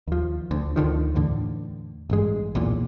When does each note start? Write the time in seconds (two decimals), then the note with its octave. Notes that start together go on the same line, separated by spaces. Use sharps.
0.08 D#2 F3
0.51 D2
0.76 D2 D3 D#3 F3
1.15 E2 A2 D3
2.10 A1 G2 G#3
2.55 B1 E2 A#2